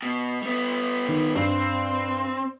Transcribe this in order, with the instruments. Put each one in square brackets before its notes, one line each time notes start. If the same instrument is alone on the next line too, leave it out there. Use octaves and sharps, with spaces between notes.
[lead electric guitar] B2
G3 B3
[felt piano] D#3
[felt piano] G2 [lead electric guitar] C4